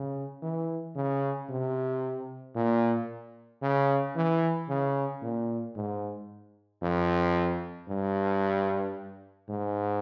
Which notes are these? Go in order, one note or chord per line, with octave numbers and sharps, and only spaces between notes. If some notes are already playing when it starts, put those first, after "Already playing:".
Already playing: C#3
E3
C#3
C3
A#2
C#3
E3
C#3
A#2
G#2
F2
G2
G#2